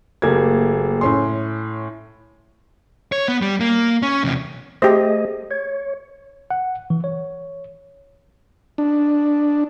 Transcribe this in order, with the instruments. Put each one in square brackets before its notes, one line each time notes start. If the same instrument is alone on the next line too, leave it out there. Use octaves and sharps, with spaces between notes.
[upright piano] F#1 A3 A#3 G4 G#6
A2 C#4 C6
[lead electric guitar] C#5
B3
G3
A#3
C#4
E2 C3
[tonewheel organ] A3 G#4 D#5 [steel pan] G4 C5
[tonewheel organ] C#5
[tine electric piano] F#5
E3
C#5
[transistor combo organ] D4